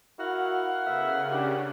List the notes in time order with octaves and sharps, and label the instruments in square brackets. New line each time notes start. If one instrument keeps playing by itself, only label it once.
[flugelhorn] E4 [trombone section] F#4 [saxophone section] A#4 F5 F#5
[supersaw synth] C#3 [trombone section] B3 E4 A4 [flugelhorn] E5
[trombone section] D4 [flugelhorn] G4